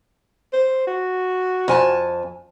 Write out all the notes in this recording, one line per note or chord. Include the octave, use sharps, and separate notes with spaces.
C5
F#4
F2 G#5 A5